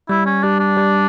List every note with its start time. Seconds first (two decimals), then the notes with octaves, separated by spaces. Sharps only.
0.09 G3 E4
0.26 C#4
0.43 G3 D4
0.60 D4
0.77 G3